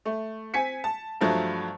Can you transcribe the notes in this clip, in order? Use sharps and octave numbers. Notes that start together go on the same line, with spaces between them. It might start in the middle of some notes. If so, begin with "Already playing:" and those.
A3
C4 G#5 B6 C#7
A5
G2 F3 F#3 A3